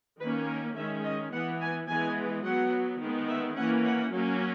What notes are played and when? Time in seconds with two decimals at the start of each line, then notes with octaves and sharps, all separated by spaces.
0.19 D#3 A#3 C#4 B4
0.47 A#4
0.75 D#3 G#3 C#4 E5
1.04 D#5
1.32 E3 B3 F#5
1.60 G#5
1.88 E3 G#3 B3 G#5
2.43 F#3 B3 F#5
3.00 D#3 G#3 B3
3.28 E5
3.56 E3 A#3 C#4 F#5
3.84 F#5
4.12 F#3 A#3 C#4